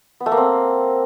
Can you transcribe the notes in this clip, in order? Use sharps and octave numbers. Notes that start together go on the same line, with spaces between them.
B3
A3
A#3
C4